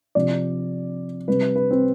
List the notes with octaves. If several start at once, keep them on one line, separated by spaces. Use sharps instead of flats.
C3 F3 D5
C3 G3 B4
B4
C4